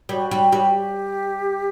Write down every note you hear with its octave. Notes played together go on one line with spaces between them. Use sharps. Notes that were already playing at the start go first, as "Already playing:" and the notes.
G3 F#4
G3
G3
G4